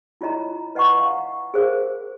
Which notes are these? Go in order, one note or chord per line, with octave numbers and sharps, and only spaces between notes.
E4 F4 C#5 D#5 A#5
B4 D#5 F#5 A#5 C#6
F5 F#5
G#4 A#4 C5 F5